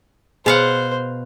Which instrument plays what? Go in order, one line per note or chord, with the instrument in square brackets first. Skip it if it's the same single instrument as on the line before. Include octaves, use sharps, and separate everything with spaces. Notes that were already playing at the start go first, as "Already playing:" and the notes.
[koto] B2 F5 F#5 [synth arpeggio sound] G#4 [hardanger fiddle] C5